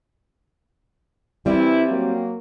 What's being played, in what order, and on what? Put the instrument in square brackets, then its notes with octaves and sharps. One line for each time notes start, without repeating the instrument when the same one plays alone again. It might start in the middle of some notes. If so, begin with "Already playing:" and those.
[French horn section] E3 E4 [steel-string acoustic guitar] G3 C4 D5
[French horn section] F#3 A#3